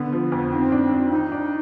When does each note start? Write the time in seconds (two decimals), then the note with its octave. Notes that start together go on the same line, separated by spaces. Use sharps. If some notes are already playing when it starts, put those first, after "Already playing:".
Already playing: D3 B3
0.13 F3
0.32 F2
0.52 D#3 C4
0.72 D4
0.92 D4
1.11 D#3 D#4
1.32 D4